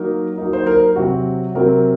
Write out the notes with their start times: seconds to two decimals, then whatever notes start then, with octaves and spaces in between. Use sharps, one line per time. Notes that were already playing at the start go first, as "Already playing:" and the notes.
Already playing: F#3 A#3 D#4 A#4
0.38 F#3 A#3 D#4
0.53 C5
0.67 A#4
0.96 C3 F#3 C4 F#4
1.55 C3 F#3 C4 A#4